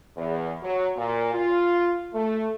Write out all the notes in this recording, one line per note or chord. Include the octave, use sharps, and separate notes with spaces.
E2
F#3
A#2
F4
A3